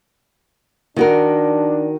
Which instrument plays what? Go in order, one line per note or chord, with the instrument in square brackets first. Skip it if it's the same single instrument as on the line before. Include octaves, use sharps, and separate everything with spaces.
[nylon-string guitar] D#3 F#4 A#4 [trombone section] D4